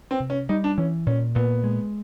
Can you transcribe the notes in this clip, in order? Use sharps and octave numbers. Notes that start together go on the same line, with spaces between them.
C4
C3
C#4
G3 D#4
D4
E3 C#4
A#2 C#4
A#2 B3
G#3